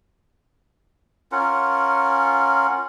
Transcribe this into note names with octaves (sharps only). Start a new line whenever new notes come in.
C#4 F4 A#4 F#5